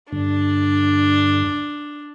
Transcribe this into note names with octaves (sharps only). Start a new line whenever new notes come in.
G2 D3 D4